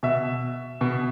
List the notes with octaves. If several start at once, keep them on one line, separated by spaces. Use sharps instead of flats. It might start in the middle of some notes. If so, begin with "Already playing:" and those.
B2 E5
B2